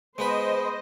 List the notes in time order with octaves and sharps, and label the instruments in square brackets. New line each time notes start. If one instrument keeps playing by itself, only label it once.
[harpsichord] G#3 B3 B4 [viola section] C5 D#5